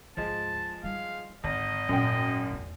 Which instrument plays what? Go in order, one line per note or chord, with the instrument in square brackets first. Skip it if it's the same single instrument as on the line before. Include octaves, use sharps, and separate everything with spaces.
[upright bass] D2 G#2 [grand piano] F3 G#3 [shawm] A5
[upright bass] G3 D#4 [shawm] F5
[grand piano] G#1 [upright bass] D3 [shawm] D#5
[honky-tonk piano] F#2 G5 [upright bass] A#2
[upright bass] E2 A3